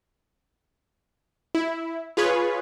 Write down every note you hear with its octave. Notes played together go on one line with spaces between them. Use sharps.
E4
F4 G#4 B4 C#5